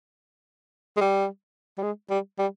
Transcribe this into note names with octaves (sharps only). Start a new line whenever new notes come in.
G#3
G3
G3
G#3
G3
G3